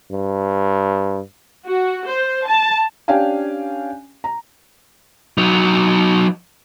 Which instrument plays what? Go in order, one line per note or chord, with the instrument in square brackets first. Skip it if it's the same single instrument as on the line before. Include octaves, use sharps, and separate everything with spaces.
[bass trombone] G2
[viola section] F#4
C5
A5
[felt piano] C#4 D4 G4 F5 G5 G#5
A#5
[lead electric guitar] F#3 D#4